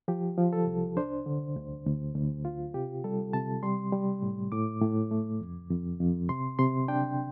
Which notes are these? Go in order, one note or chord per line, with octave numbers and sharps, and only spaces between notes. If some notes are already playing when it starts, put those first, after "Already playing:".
F3 G4
F3
A4
C2
D4 C5
D3
D2
D2
D2
F4
C3 G4
G3 A4
C3 A5
G3 C6
G3
A2
A2 D6
A2
A3
F2
F2
F2
C3 C6
C3 C6
D4 G5